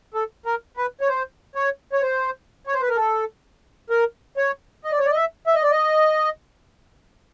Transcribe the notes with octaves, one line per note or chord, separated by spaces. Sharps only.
A4
A#4
B4
C#5
C5
C#5
C#5
C5
C#5
C5
B4
A#4
A4
A#4
C#5
D#5
D5
C#5
D5
D#5
E5
E5
D#5
D5
D#5